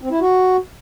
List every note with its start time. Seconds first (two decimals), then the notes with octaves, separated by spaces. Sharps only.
0.01 C4
0.11 E4
0.21 F#4